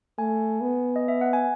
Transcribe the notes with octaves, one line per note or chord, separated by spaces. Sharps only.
A3 G#5
B3
D#5
E5
F#5
G#5